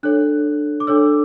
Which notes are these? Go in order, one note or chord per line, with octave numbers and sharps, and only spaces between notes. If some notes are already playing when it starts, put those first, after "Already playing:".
D4 A4 C#5 F#6
D6
D4 A4 C#5 E6